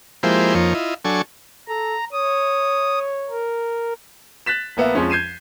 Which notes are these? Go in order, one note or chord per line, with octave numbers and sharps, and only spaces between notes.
F3 G#3 A#3 E4 G4 C5
F2 F3 A#3 D#4 C#5
E4 F4 D#5
F#3 D4 A4 G#5 C#6
A4 A#5
C#5 D#6
A#4
F#6 A6 B6 E7
A#1 A#3 B3 E5
F2 F3 G#3 C4 C#4
G6 G#6 C7 D#7 E7